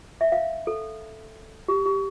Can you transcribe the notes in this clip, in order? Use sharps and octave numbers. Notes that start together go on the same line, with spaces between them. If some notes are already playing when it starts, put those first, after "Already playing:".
E5
F5
A4
G4
G4